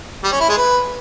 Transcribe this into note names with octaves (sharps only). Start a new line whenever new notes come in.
G3
C#4
E4
G#3
B4